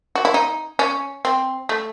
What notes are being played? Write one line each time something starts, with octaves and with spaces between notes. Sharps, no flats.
F#4
E4
D#4
C#4
C4
A3